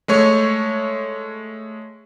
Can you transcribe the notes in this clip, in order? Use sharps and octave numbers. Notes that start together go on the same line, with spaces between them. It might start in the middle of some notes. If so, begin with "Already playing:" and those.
G#3 A3 C#5 C#6